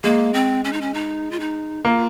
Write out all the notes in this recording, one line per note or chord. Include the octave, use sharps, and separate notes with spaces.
G#3 A#3
C4
C#4
D#4
C#4
D#4
F4
D#4
A#3 F4